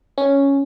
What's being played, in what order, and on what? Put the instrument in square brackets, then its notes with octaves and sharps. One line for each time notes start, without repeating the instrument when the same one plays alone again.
[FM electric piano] C#4